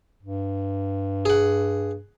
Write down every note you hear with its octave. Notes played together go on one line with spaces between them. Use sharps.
G2
G#4 F#5